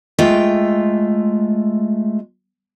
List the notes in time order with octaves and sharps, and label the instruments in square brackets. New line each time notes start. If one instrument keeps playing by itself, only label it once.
[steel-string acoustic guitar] G#3 A3 F4 G5